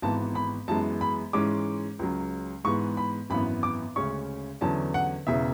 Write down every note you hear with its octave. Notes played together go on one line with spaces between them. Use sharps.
G#1 G#2 E3 B3 A5
B5
F#2 E3 G#3 B3 A5
B5
G#2 E3 G#3 C#4 D6
C#2 C#3 F#3
G#2 E3 G#3 B3 C#6
B5
G#1 F#2 E3 B3 B5
D6
D2 C#3 G#3 C#4 C#6
E2 D3 F#3 C#4 A5
F#5
E1 E2 C#3 E5